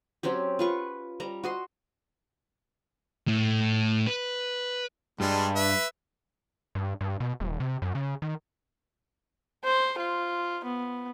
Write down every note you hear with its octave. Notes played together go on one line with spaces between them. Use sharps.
F#3 C4 C#4 G4
F4 B4 C#6
G3 A#5
F#4 D#5 C6
A2
B4
G2 G3 G#3
B4 E5
G2
G2
B2
D#1
C3
F#2
C#3
D#3
C5
F4
B3